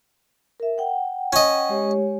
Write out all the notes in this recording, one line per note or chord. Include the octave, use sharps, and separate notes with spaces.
A#4 E5
F#5 G5
C#4 D#5
G#3 G4 C#5